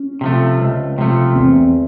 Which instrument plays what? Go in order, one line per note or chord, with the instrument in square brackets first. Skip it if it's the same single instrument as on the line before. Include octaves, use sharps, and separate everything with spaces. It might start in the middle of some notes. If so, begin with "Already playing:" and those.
Already playing: [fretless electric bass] C#4
[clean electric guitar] C3 F3 A3
C#2
C3 F3 A3
[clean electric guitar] E2 [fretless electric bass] C4